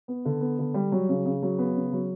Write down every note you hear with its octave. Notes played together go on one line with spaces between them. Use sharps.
B3
D3
B3
D3
G3
F#3
C#3
C#3
F#3
B3
C#3
F#3